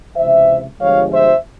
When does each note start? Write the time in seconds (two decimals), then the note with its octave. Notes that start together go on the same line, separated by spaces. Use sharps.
0.16 C#2 C3 E3 C5 E5
0.80 G1 G2 F3 G#3 C#5 F5
1.12 C5 E5